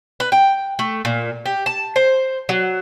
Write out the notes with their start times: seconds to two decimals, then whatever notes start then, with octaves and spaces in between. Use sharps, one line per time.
0.20 B4
0.32 G5
0.79 A3
1.05 A#2
1.46 G4
1.66 A5
1.96 C5
2.49 F#3